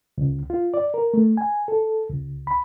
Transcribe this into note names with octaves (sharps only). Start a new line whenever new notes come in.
C#2
F4
D5
A#4
A3
G#5
A4
C#2
B5